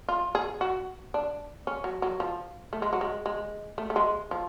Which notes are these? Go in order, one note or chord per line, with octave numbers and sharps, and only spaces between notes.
F4
G#4
F#4
D4
C#4
F#3
F#3
F3
A3
G#3
F#3
G#3
G#3
A3
A3
G#3
F3